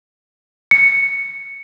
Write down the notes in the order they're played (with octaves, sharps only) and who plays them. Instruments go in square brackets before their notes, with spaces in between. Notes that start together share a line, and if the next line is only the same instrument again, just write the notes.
[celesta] C#7